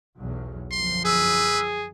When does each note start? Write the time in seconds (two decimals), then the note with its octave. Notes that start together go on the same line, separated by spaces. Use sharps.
0.19 B1 E2 F#3
0.71 G1 F#2 F3 C6
1.05 G#4 B4 E6